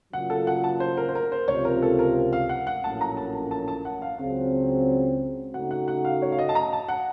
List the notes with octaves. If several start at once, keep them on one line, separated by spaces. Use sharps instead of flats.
C#3 F#3 A#3 F4 F#5
A4
F#5
A5
C5
A#4
C5
A#4
C5
C#2 C3 F3 C4 F4 C#5
A#4
A4
A#4
F5
F#5
F#5
A#1 A2 F#3 A#3 C#4 A5
A#5
A5
A5
A5
F#5
F5
C#2 C#3 F#3 C4 F5
C#3 A3 D#4 F#4 F#5
F#5
F#5
F5
C#5
F5
D#5
A5
A#5
A5
F#5